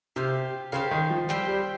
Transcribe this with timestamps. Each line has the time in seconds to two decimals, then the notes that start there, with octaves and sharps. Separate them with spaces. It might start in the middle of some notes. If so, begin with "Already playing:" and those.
0.16 C3 G4 C5 F5
0.72 C#3 G4 C5 F5
0.91 D#3
1.10 F3
1.29 G3 C4 G4 C5 G5
1.48 G3